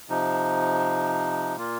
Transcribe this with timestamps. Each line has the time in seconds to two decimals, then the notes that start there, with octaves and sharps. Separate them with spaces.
0.09 C3 F3 D#4
1.57 A#2 A#3 F4